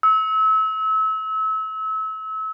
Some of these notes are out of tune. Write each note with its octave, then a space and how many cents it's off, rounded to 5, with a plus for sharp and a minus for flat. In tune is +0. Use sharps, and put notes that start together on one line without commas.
E6 -30